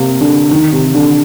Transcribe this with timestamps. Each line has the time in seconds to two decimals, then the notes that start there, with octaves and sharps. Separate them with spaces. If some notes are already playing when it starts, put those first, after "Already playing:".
Already playing: C3 A#3
0.21 D3
0.51 D#3
0.72 C3
0.94 D3